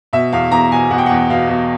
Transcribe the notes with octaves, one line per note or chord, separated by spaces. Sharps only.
B2 E5
E2 F5
E2 A#5
B2 G#5
B2 F#5
G5
E2 F#5
B2 F5
B2